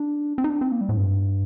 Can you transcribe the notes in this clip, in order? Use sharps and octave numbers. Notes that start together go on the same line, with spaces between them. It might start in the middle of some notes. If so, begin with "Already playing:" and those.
Already playing: D4
C4
D#4
D4
C4
A#3
G3
A2
G2